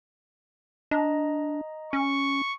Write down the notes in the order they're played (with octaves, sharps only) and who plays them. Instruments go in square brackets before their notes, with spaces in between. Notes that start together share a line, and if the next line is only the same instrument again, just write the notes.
[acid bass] D4 [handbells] D#5 A#5
[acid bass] C#4 [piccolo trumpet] C#6